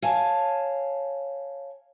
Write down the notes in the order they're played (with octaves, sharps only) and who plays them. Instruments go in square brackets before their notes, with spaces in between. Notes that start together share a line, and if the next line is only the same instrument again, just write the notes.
[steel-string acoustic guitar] C#5 F5 G#5 A5